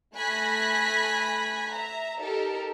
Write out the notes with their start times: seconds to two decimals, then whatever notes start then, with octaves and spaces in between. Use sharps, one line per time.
0.15 A3 G#5 B5 F#6 A#6 B6
1.71 E5 A#5
2.21 D#4 G4 A4 A#4